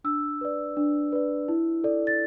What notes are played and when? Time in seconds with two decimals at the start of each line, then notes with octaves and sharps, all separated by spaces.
0.04 D4 E6
0.41 B4 D5
0.77 D4
1.12 B4 D5
1.48 E4
1.84 A4 D5
2.07 A6